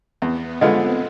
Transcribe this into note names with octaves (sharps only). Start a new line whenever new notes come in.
E2 B3
D3 G#3 B3 C4 F4